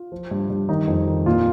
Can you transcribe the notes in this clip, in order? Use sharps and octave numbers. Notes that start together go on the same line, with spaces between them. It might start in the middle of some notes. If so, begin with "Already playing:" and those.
Already playing: F4
F3
G2
G2
D#3 D#4
F2
D#3
A#2 F4